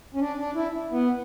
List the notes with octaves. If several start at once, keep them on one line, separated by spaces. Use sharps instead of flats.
C#4
D4
D4
E4
B3